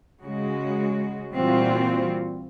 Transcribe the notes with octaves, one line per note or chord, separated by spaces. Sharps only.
C#3 G#3 F#4
A#2 E3 G3 C4 F4 F#4